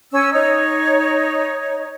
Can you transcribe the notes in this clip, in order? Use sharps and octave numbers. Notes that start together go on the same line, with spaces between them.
C#4 E6
D#4 C#5